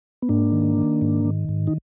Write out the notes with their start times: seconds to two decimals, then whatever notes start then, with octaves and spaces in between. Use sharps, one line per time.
0.22 B3
0.29 G#2 A#3 D4
0.52 D#3
0.78 D#3
1.02 G#2
1.25 D#3
1.49 G#2
1.67 D#4